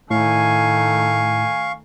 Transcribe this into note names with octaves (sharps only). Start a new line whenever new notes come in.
A2 D#3 A3 F5 G#5 C#6